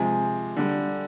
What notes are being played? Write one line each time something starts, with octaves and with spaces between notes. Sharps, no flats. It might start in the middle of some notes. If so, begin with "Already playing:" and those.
Already playing: C3 F3 G#3 G#5
D3 G3